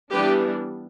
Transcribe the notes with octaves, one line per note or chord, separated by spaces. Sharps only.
E3 G3 B3 D4 G4 B4